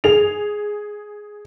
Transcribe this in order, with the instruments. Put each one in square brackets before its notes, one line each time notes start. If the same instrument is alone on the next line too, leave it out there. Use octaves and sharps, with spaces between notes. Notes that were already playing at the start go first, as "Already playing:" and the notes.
[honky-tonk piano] G#4 F7